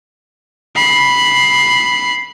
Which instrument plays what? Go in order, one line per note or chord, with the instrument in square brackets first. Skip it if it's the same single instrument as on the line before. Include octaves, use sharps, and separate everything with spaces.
[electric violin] B5 C7